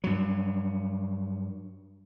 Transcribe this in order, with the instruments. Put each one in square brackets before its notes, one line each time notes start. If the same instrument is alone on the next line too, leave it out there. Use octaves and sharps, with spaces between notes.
[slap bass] G2 F#3